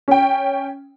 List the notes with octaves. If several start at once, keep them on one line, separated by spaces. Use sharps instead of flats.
C#4 G5